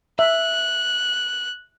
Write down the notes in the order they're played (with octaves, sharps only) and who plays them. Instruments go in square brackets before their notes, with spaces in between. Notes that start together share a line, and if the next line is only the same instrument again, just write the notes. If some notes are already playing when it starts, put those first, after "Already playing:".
[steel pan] E5 [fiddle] F#6